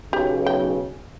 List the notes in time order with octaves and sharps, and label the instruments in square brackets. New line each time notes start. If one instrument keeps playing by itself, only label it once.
[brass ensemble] B1 C#3 [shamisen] G4
[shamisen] G5